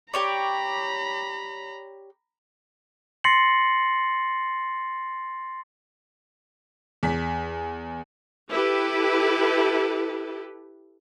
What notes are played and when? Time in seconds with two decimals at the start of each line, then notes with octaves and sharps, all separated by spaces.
0.14 G4 C#5 D5 A#5 B5
3.24 C6 A6 A#6 C7 C#7 F#7
7.03 E2 B6
8.50 E4 G4 A4 B4